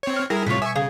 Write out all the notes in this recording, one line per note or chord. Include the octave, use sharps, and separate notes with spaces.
C4 C#5
F6
G3 E4 G#4 A#4
A2 C3 F4 B4 C#5
B2 E5 G#5 C#6
C#3 G#4 F5